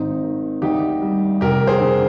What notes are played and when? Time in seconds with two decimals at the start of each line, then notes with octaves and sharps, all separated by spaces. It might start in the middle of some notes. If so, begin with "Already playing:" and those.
Already playing: G#1 C4 D#4
0.24 D#3
0.62 D2 D#4 G4
1.02 G3
1.41 F1 G4 A#4
1.67 G#4 C5
1.81 D3